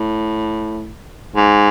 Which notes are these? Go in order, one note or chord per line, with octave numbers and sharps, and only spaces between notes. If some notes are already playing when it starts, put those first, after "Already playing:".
Already playing: A2
G#2